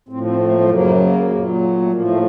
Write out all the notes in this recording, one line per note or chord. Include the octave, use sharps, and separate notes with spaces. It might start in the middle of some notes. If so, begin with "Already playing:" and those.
A2 F3 C4
C4
A3
A#3
A3
F#2 C#3 F#3 A#3
A#3
A#2 F#3
A#3
A3
A2 F3 A#3
A3